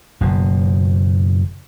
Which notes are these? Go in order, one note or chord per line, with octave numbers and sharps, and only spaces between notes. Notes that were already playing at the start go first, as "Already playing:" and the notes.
F#1 B2